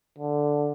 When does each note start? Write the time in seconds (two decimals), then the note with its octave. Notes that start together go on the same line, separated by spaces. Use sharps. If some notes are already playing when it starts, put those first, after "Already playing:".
0.18 D3